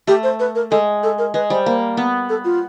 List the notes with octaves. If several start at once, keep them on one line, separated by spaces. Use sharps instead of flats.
A3 G4
C5
B4
A#4
G#3 A4
A4
A#4
G#3 B4
G3 C5
A#3
B3
A4
F4